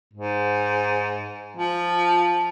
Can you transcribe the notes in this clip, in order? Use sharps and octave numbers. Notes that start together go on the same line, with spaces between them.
G#2
F3